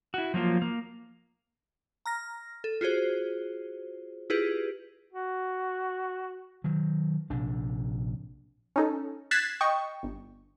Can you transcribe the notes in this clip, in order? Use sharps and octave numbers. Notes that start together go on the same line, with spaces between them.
E4 F#4
F3 F#3 A#3 F4
A#3
A#5 F6 A#6
A4
F4 F#4 G#4 C5
E4 F4 G4 G#4 B4
F#4
D#3 F#3
A#1 C3 D4
C#4 D#4 A4
F#6 G#6 A6 B6 C7 E7
D#5 G5 C#6
G1